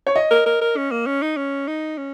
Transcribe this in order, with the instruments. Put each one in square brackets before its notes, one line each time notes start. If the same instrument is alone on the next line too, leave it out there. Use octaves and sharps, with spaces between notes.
[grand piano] C#5
D#5
[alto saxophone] A#4
A#4
A#4
C#4
A#3
C#4
D#4
C#4
D#4
C#4